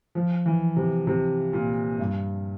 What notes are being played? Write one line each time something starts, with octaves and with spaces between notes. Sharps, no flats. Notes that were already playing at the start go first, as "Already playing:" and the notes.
F3
E3
C3
C3
A#2
G2